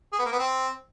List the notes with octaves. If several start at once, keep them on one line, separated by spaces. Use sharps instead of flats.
G#4
B3
A#3
B3
C4